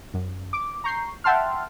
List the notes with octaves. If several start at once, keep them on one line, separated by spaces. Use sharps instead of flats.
F#2
D6
A#5 C#6 G6 C7
E5 F#5 G5 A5 C6 F6